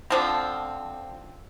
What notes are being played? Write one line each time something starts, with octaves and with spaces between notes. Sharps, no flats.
D3 F3 C4